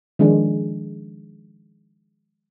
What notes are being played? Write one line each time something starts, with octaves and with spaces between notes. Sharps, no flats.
D#3 F3 G#3 D4